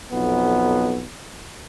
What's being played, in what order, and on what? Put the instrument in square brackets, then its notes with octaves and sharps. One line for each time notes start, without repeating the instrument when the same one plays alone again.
[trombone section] B1 F2 B3